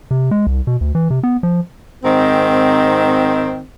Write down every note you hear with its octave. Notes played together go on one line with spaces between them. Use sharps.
C3
G#3
C2
B2
D2
E3
C3
B3
F3
G#2 D#3 C4